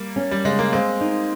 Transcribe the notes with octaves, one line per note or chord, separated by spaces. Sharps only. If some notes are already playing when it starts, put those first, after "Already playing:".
Already playing: G3 A#3
C#4
G3
C#3 G#3
A#3
G#3 A#3 C4
D#4